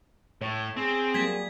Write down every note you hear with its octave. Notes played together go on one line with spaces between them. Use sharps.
A2 C#5
C4 G#4
F#3 G3 A#3 G#6 B6